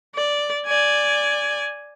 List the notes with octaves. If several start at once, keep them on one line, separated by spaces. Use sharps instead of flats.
D5
D5 G#5